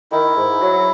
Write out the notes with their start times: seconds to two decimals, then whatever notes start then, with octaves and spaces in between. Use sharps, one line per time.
0.12 D#3 E4
0.36 G#2
0.61 F#3